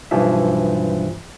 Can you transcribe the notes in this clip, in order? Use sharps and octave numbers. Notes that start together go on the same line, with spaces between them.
B1 G2 E3 F3 E5